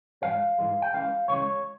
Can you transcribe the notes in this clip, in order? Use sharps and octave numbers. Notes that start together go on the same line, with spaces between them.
G#2 E3 G#3 F5
G#2 E3 G#3
G5
C#2 C#3 E3 G#3 F5
C#2 C#3 E3 G#3 C#5